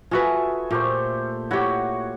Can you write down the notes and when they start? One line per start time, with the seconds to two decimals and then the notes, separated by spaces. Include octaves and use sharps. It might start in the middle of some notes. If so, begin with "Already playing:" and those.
0.11 F4 F#4 G#4 A4 B4 E5
0.71 A#2 A3 G4 C5
1.51 E4 F#4 G4 C#5 F#5